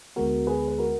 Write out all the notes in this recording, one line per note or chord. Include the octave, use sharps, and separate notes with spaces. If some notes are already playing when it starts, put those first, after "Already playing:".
D2 D3 G#3 B3 F#4 A#4
G#4 B4
B4
F#4 A#4